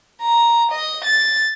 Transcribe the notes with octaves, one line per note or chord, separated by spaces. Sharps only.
A#5
D#5
A6